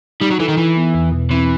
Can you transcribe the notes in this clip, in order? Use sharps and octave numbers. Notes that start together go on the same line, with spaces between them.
G3 D#4
F#3
E3 A4
D#3
E3 E4
B3
E2
B2
E3 C4